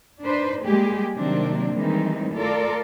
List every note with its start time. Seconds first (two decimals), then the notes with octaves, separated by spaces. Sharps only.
0.22 D4 D#4 B4 C5
0.64 G3 G#3 A#3 G4 G#4
1.16 C3 D#3 F#3 A#3 C4 D4
1.73 D#3 E3 G3 G#3 C4 D#4
2.36 A3 F4 A4 A#4 D5